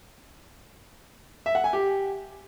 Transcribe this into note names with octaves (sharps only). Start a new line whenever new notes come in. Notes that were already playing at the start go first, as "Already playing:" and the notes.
E5
F#5
G#5
G4